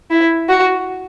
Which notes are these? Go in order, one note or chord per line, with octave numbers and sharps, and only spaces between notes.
E4
F#4